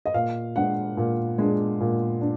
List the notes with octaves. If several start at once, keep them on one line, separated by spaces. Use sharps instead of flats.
D#5
A#2 F5
G#3 D4 F#5
A#2
G#3 D4
A#2
D4